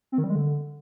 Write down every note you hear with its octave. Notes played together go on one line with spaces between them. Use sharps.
C4
D#3
G3
G#3
D3